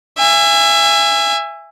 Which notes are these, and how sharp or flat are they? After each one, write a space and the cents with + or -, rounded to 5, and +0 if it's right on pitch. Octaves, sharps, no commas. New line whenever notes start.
E5 +20 G#5 -20